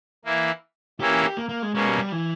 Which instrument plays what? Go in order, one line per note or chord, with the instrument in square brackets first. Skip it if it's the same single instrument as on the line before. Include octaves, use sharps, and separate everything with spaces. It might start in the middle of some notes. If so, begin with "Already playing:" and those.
[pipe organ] E3 A#3 E4
[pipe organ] E3 A#3 C#4 E4 [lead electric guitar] G4
[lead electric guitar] G4
G4
A#3
A#3
G#3
[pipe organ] B2 A#3 C#4 [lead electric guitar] G#3
[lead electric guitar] G3
G3
E3